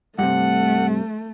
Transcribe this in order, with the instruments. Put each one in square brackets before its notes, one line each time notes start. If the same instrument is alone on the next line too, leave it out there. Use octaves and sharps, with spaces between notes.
[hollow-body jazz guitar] G2 C3 [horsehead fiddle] A3 [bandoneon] F#5